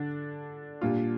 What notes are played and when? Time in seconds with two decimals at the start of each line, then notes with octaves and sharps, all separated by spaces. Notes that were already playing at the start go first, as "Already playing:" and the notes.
Already playing: D3 D4
0.81 A#2 G3 D4 F4